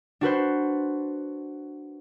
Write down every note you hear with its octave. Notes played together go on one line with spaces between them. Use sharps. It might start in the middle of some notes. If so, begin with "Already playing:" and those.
D4 F#4 B4 C5